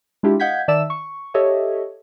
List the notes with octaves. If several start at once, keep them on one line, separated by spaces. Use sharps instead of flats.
G#3 D4 E4 F4 G4
D#5 F5 F#5 G6 G#6 B6
D#3 D5 E5 A5 E6 E7
C#6
G4 A4 C#5 D#5 E5